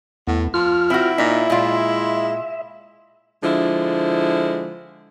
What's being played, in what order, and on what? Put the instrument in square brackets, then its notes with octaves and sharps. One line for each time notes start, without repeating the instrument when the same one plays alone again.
[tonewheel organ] E2 B3 [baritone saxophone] A2
[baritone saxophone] F3 [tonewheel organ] F4 F6
[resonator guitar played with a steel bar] C4 F#4 [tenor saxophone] E4
[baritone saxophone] A#2 [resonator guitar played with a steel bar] D#4 [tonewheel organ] E5
[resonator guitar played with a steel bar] A#2 F4 [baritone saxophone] G#3
[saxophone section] D3 F3 G#3 E4